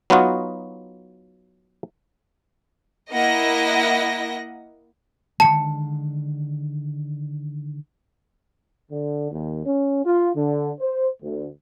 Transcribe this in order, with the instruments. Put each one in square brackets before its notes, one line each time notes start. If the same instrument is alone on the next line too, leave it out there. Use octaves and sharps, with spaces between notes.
[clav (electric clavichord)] F#3 B3 D#4 F4 F#4
[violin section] A#3 E4 D#5 F#5 A#6
[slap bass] D3 D#3 G#3 [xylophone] A5 C#7
[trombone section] D3
D#2
C#4
F4
D3
C5
D2